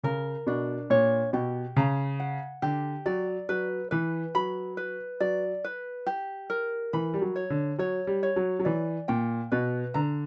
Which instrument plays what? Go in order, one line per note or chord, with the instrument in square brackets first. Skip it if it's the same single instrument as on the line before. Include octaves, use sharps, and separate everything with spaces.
[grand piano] C#3 [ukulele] A#4
[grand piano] B2 [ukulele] D4
[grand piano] A#2 [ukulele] C#5
[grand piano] B2 [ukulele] G4
[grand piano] C#3 [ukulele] A#5
[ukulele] F#5
[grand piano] D3 [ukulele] G4
[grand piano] F#3 [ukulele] D5
[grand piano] F#3 [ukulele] B4
[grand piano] E3 [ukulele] B4
[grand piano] F#3 [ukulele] B5
[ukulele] B4
[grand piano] F#3 [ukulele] D5
[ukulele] B4
G4
A#4
[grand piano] E3 [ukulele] B5
[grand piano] G3
F#3
[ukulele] C#5
[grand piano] D3
[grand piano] F#3 [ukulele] C#5
[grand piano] G3
[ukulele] C#5
[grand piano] F#3
F#3
[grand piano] E3 [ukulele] D5
[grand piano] A#2 [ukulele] G5
[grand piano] B2 [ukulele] B4
[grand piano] D3 [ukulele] A#5